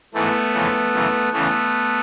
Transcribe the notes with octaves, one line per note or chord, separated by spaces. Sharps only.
G#2 E3 A3 B3
F2 C#3 E3
F#2 C#3 E3
E2 C#3 E3 A3 B3